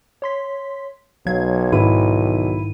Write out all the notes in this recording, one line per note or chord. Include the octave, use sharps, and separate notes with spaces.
C#5 C6 B6
B1 F#3 F5 G#6
G#2 D#3 E4 D#7